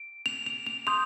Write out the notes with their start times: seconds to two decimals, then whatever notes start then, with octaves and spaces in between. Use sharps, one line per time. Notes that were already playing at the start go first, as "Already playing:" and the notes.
Already playing: D7
0.26 F7
0.46 F7
0.67 F7
0.87 C6 D#6 G6 F7